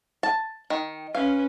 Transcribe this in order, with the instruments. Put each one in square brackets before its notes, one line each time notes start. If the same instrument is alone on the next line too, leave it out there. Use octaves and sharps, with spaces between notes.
[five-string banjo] A5
D#3
[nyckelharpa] C#4 B4 [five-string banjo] F5